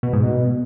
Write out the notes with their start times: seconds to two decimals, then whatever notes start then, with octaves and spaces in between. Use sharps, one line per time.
0.03 B2
0.13 G#2
0.23 B2